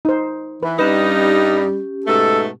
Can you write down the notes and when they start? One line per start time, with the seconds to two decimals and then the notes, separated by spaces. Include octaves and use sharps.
0.05 D#4 C5
0.63 E3 B4
0.79 G2 G3 C#4 D#4 G4 B4
2.06 G#2 B2 A3 A4